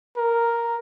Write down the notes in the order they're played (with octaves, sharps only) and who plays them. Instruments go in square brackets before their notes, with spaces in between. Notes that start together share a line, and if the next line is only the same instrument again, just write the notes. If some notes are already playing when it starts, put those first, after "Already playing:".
[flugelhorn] A#4